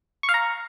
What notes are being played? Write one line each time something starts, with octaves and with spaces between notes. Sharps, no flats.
C#6
F5
A#5